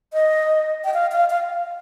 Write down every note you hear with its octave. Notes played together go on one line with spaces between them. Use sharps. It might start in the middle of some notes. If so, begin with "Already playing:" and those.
D#5
G5
F5
F5
F5